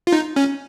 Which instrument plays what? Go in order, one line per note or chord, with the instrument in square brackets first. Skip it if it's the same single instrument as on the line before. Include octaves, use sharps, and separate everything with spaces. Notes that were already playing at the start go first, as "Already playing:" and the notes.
[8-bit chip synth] F4
D#4
C#4